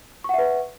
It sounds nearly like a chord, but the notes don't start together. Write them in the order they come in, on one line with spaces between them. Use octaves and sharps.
C#6 F#5 E5 B4